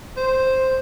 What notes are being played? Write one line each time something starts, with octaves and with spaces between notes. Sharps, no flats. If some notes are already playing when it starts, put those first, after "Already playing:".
C5